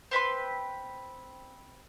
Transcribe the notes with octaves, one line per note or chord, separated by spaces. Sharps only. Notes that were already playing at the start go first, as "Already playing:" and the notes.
C4 B4 B5 C6